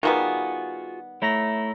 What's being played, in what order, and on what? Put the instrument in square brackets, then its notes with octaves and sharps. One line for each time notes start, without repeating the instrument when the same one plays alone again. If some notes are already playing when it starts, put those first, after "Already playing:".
[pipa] D#3 G3 B3 [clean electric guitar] F4 F#4 G#4
[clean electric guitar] A3 E4 [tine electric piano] C#5 A#5 A#6